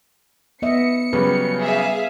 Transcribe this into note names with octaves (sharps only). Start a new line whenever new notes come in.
B3 D#5 E5 C#7
C#3 F#3 G3 B4
G#4 E5 F5